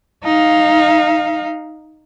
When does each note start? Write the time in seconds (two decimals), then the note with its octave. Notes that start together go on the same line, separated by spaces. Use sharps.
0.24 D#4 F5